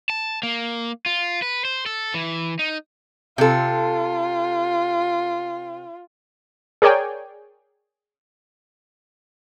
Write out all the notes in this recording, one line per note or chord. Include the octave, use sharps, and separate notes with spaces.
A5
A#3
F4
B4
C5
A4
E3
D#4
C3 F4 A4
G#4 A#4 C#5 D5 G5 G#5